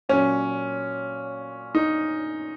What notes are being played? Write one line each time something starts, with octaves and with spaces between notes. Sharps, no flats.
A#2 F#3 C#4
D#4